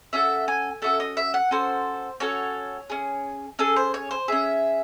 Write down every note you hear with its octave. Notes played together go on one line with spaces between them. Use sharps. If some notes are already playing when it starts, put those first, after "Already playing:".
C#4 F#4 A4 E5
G#5
C#4 F#4 A4 E5
D#5
E5
F#5
C#4 F#4 A4 C5
C#4 F#4 A4 C#5
C#4 G#4
C#4 G#4 A4
C5
C#5
C5
C#4 G#4 E5